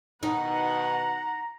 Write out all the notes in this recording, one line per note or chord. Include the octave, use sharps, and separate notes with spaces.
B2 D#3 D#4 F#5 A#5